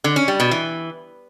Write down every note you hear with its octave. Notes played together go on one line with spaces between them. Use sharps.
D3
C#4
G3
B2
E3